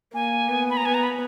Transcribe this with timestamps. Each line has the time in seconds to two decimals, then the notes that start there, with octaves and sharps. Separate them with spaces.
0.14 A#3 G#5
0.49 B3
0.70 B5
0.77 A#5
0.85 B3 G#5
0.94 A#5
1.03 B5